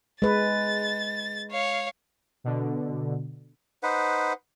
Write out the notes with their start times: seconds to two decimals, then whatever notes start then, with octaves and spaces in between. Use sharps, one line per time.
0.22 G#3 B4 A6
1.51 C#5 F5
2.44 B2 D3
3.83 D#4 B4 C5 F#5